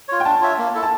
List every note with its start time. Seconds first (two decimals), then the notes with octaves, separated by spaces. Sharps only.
0.08 F4 C#5
0.20 G5
0.25 D4 A5
0.41 F4 C#5 E5
0.58 A#3
0.75 E4 A4
0.83 A5